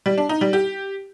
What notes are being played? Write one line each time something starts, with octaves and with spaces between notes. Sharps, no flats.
G3
D4
D#4
G3
G4